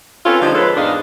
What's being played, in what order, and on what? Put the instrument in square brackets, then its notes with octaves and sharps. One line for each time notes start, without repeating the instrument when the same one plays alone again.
[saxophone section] C4 C#4 F4 A4 B4 C#5
D3 F3 G3 G#3 D#4 G4
F3 G#3 A#3 A4 B4 C#5
E2 G#2 D4 D#4 D#5 F5